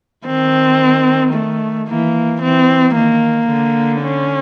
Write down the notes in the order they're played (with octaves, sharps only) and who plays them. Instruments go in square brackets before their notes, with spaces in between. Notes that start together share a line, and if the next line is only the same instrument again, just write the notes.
[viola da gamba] D#3 [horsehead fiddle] C4
[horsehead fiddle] A3
[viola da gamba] E3 [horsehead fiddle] A#3
[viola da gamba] E3 [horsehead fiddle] C4
[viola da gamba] D#3 [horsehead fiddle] A#3
[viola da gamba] D3
[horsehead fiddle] C#4